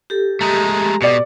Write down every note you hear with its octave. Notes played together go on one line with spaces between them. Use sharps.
G4 A4
G#3 A3 A#5
B2 D5 C#7